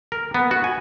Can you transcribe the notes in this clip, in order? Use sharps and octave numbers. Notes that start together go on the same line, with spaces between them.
A#4
B3
F#4
G#5